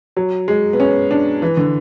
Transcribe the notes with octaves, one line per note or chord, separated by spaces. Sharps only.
F#3
G#3
B3
C#4
D4
E3
D3